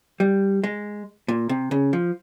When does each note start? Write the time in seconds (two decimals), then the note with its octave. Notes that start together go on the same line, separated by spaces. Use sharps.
0.20 G3
0.64 G#3
1.28 A#2
1.49 C3
1.71 C#3
1.93 F3